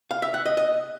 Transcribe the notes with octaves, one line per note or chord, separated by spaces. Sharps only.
F5
E5
F#5
D#5
D#5